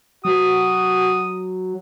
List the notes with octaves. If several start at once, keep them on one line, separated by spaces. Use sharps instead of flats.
F#3 F#4 D#6